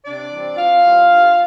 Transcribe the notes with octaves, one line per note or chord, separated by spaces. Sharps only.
C3 D4 D5
E3 G3 C4
C3 F4 F5
E3 G3 C4
G2